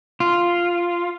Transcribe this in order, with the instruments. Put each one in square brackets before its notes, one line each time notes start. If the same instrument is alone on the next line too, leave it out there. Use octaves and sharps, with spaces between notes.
[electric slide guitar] F4